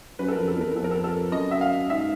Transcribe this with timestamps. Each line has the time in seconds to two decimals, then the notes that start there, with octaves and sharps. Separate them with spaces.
0.19 F#2 B4
0.28 A4
0.33 F2 A#4
0.48 A4
0.57 E2 A#4
0.76 F2 A4
0.84 A#4
0.91 A4
1.04 A4
1.32 F#2 D#5
1.51 E5
1.61 F5
1.90 G#2 E5